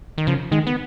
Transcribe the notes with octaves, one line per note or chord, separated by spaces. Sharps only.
D#3
C#3 F3
D#3 G#3
B3